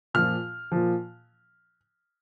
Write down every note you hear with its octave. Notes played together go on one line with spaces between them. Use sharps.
A#2 F3 F6
A#2 F3